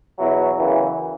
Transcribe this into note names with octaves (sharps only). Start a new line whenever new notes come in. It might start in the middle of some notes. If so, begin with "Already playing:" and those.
E2 B2 F#3 E4
F#2 C#3 E3